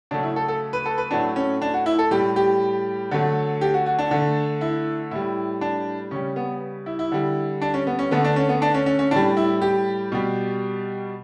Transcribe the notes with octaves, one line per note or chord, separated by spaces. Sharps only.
C#3 F#3 A3 D4
E4
A4
A4
B4
A4
B4
A2 F#3 A3 D4
C#4
D4
F#4
E4
A4
A2 G3 G4
G4
D3 F#3 A3
G4
F#4
F#4
D4
D3 A3
E4
A2 G3 E4
D4
C#3 G3 C#4
B3
E4
E4
D3 G3
D4
C#4
B3
C#4
D3 A3 B3
D4
C#4
B3
D4
C#4
C#4
C#4
A2 G3 D4
E4
G4
B2 G3